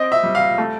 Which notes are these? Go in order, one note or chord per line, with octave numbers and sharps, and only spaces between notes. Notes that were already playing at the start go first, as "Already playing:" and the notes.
Already playing: C4 D#5
E5
G3
F5
A3